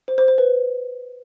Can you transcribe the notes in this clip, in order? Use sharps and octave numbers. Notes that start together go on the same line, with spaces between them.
C5
C5
C5
B4